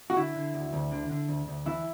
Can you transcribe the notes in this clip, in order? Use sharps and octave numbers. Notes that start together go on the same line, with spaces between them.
F#4
D3 E4
D3
D2
D2
D3
D3
D2
D2
E3 E4